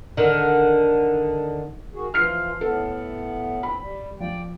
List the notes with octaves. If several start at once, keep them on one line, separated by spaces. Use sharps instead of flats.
D3 D#3
D#3 F#4 G#4
E3 F3 F4 F6 C7
A2 B3 A4
C4 B5
G3
F3 D5 G5